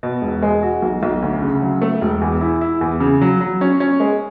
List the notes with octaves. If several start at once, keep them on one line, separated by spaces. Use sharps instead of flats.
B2
E1
G#3
F#4
B1
B1
D2
C#3
F#3
A3
E1
E2
E4
E4
E2
C#3
F#3
F#3
C#4
C#4
G#3